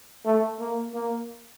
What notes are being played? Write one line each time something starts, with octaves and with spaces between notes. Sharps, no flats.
A3
A#3
A#3